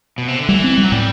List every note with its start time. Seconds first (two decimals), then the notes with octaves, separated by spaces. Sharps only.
0.18 B2
0.28 C3
0.39 D3
0.49 E3 G3
0.64 C4
0.78 G3
0.83 F#3
0.92 A2 G3